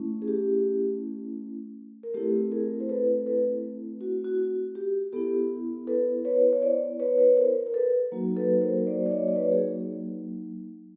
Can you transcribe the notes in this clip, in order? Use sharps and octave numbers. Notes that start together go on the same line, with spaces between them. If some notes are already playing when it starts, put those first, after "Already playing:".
Already playing: A3 C#4 E4
G#4
G4
A#4
A3 C4 E4 G4 A4
G#4 A#4
C5
A4 B4
A4 B4
F#4
F#4
F#4
G4
B3 E4 G4 A4
A4 B4
B4 C#5
C#5
C5 D5
B4 C#5
B4 C#5
A#4 C5
A#4
A4 B4
F#3 A#3 D#4 F#4
A4 B4
A#4 C5
C5 D5
D5
C#5 D#5
D5
B4 C#5
G#4